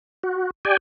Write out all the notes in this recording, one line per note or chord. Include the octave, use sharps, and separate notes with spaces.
F#4
G4 D5 G5 G#5